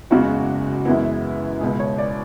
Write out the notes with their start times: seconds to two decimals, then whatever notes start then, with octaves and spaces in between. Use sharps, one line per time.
0.10 F#1 E2 C#3 G#3 F#4
0.85 F#2 E3 G#3 B3 E4
1.61 C#2 B2 G#3 G#4
1.79 C#5
1.98 D5